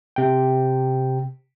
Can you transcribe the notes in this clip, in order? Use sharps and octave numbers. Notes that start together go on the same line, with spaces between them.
C3 G5